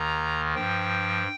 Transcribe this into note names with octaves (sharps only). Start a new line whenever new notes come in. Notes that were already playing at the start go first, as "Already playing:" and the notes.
Already playing: D#2 D#3 A#5
G2 F3 G5